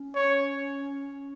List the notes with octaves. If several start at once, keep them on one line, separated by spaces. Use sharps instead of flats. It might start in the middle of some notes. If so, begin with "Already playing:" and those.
Already playing: C#4
C#5